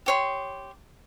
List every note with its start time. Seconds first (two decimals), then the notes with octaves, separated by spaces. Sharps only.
0.06 G4 C#5 C6